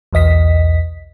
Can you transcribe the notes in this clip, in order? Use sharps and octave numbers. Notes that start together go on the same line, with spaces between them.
B1 E2 D#5 B6